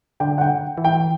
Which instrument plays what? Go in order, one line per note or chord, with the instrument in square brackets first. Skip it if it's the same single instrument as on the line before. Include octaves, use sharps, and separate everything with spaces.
[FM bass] D3 [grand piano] G5
[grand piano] F#5
G5
[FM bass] E3
[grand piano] G5